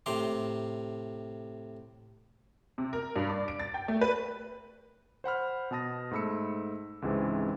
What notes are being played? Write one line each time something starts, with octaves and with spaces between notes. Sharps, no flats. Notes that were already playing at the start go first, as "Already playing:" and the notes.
A2 C3 A#5 C6 D6
C3
A#4
G2
D5
D7
A6
G5
A3
B4
C5 F#5 B5 F6
B2 B3 A5 D#6 A#6
G#2 A3 B5 E6 C#7
C#2 G#2 C3 E3 G#3 C4